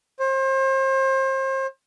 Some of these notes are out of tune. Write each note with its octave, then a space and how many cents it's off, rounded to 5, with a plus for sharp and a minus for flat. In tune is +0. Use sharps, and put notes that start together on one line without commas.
C5 +35